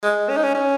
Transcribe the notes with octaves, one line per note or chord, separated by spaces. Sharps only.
G#3
C#4
D#4
C#4
C#4